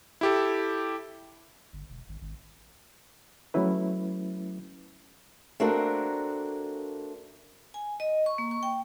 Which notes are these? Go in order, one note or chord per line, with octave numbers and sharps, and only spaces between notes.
E4 G4 A4
G1
E1
G#1
G#1
F#3 A3 C#4 E4 B4
A3 A#3 C4 D4 F#4 A#4
G#5
D#5
C#6
A#3
C#6
G5